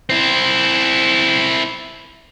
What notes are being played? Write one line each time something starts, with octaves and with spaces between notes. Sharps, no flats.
C4 E4